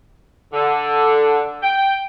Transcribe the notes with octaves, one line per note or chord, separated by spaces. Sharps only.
D3
G5